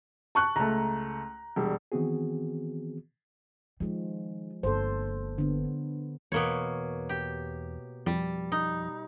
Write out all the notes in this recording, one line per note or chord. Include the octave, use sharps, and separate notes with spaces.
A5 C#6 F#6
C#2 A3 A#5
E1 G3
D#3 E3 B3 C4 F#4 G#4
D#3 F3 G#3
G1 A#3 A4 C5
D3 B3
E2 B2 A#3 C#5
G4
F2 G3
D#4